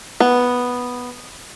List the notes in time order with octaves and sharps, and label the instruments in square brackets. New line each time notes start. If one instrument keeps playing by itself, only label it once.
[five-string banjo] B3